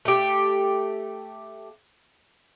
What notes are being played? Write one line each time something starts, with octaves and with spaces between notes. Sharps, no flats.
A3 G4